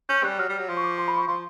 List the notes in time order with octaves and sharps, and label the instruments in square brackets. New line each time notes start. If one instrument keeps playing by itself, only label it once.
[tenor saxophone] C#4 [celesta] G6
[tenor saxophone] G3 [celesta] F#6
[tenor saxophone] F#3 [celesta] F6
[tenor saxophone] G3
F#3
F3
[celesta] C#6
D6
C6
B5
C#6
[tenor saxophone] F3 [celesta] C6